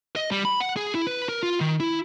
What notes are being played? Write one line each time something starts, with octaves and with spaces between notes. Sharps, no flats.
D#5
G3
B5
F#5
G#4
E4
B4
A#4
F4
D#3
E4